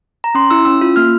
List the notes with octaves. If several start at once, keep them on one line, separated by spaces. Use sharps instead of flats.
A#5
C#4 C6
E4 E6
C#4 E6
F4
A#3 F6